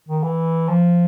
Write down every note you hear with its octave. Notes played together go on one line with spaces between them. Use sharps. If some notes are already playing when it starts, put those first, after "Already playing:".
D#3
E3
F3